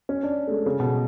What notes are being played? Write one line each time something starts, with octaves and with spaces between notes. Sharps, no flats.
C#4
D4
A3
G#3
C#3
B2